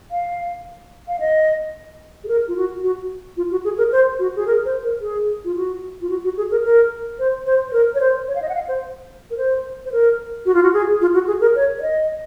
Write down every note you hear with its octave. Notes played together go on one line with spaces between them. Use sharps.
F5
F5
D#5
G#4
A#4
F4
F#4
F#4
F4
F#4
G#4
A#4
C5
F#4
G#4
A#4
C5
A#4
G#4
F4
F#4
F4
F#4
F#4
G#4
A#4
A#4
C5
C5
C5
A#4
C#5
C5
C#5
F5
D#5
F#5
F5
C5
A#4
C5
C5
A#4
F#4
F4
F#4
G#4
F4
F#4
G#4
A#4
C#5
C#5
D#5